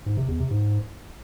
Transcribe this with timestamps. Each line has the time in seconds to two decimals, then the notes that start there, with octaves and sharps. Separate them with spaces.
0.06 G#2
0.17 C3
0.28 E2
0.40 C3
0.51 G#2